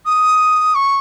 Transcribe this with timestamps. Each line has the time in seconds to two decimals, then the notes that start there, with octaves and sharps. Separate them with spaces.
0.06 D#6
0.75 C#6